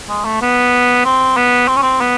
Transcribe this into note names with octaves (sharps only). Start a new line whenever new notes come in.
G#3
A3
B3
C4
B3
C4
C#4
C4
B3